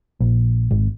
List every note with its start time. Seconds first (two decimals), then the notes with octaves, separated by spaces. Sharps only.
0.20 A#1
0.71 G#1